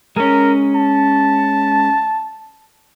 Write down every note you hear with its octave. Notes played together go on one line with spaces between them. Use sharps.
G#3 C#4 A#4
A5